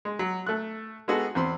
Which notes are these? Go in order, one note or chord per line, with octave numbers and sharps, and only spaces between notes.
G#3
F#3
A3 F#6
G#3 B3 D#4 F#4 G#4 A4
E2 C4 B5 C6